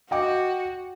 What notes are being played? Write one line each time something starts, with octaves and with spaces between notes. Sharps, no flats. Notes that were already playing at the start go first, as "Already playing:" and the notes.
F#4 D#5 G5 D6